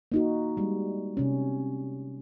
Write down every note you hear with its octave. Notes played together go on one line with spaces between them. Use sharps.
A#3 D#4 F#4
G3 G#3
C3 C#4